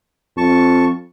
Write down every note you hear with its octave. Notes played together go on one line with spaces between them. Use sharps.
F2 A5 C#6